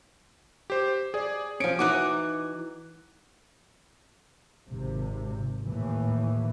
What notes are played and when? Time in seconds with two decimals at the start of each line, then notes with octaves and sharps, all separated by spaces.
0.70 G4 C5
1.14 G#4 D5
1.60 F3 C#4 C#7 D7
1.79 E3 D#4 F#4 D6 F#6
4.70 G#1 C3
5.66 D#2 A2 E3